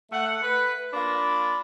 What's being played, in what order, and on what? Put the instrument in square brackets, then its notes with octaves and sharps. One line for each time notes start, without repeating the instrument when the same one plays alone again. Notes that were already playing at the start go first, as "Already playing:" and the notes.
[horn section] A3 F#5
B4
A#3 D4 F4 B5